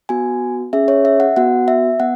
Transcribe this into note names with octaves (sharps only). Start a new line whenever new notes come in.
B3 F#4 G#5
C#4 G#4 E5
C#5
E5
F#5
B3 F#4 F#5
E5
B3 F#5